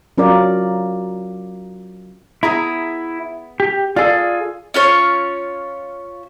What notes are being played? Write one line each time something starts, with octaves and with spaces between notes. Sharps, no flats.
F#3 C#4 F4 A#4 D5
B3 E4 G#4 A#5
G4
F4 G#4 A4 D5
C#4 F4 C#5